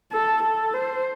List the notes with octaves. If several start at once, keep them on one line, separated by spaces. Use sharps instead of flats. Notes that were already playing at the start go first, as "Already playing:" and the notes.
A4
A4
C5